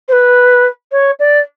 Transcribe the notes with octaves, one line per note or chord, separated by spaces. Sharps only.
C5
B4
C#5
D5